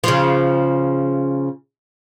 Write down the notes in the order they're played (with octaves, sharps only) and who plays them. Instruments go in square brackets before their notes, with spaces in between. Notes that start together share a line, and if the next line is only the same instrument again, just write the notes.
[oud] C#3 F3